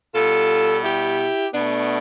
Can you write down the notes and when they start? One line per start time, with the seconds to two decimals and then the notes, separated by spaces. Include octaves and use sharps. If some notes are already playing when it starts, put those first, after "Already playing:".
0.14 B2 G3 F4 A4
0.84 E4 G4
1.54 B2 A3 B3 D4